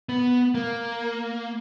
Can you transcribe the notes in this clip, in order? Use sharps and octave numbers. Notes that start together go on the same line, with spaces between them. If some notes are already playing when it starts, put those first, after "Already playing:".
B3
A#3